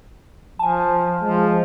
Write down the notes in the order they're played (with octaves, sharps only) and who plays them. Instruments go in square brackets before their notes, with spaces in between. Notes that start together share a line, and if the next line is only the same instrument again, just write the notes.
[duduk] F3 [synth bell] G#5 A5
[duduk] F3 [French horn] G#3